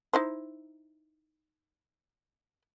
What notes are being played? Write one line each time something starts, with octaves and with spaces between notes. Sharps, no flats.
D#4 E4 C5